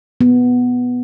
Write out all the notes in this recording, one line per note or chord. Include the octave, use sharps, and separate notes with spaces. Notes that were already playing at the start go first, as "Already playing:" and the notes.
B3